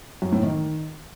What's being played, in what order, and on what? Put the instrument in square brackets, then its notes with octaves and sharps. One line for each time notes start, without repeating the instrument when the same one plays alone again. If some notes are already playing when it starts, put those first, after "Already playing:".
[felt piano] F#2
A2
D#3